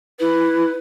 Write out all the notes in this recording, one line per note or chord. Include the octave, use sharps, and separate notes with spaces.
E4 B4